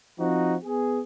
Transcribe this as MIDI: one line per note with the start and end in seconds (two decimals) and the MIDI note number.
0.20 0.56 53
0.20 0.56 60
0.20 0.56 63
0.20 0.56 66
0.64 1.02 59
0.64 1.02 68